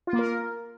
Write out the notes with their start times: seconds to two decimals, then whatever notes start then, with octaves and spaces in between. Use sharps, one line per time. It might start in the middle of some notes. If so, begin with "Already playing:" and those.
0.07 F4
0.13 A#3
0.19 A#4